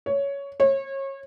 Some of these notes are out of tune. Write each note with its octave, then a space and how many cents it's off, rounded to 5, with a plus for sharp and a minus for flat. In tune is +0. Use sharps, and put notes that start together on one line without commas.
C#5 +10
C#5 -30